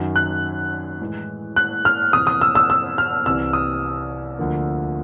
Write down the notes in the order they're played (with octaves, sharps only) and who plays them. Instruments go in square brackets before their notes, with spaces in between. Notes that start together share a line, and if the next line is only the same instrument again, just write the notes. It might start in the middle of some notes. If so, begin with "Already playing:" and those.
Already playing: [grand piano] F#2 D#3 F#3
[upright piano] F#6
[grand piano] A2 E3 G#3
[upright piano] F#6
F6
[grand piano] F2 C3 E3 [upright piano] D#6
[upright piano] D#6
E6
E6
E6
F6
[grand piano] C2 C3 E3 [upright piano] E6
[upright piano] D#6
[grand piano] D2 D3 F3 A#3